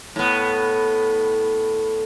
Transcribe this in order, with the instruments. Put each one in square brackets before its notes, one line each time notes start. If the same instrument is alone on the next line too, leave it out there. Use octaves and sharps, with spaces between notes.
[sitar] A2 B3